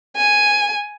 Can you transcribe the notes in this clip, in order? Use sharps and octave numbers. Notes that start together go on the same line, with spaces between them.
G#5